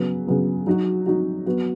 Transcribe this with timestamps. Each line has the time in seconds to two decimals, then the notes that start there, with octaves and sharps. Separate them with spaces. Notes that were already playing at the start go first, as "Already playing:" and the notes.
Already playing: C#3 F#3 B3
0.27 C#3 F#3 B3
0.67 F#3 D#4 F#4
1.06 F#3 D#4 F#4
1.46 F#3 B3 F#4